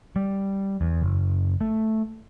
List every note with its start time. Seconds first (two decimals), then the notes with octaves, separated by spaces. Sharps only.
0.16 G3
0.81 E2
1.02 F#1
1.61 A3